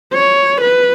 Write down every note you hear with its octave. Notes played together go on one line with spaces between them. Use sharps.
C#5
B4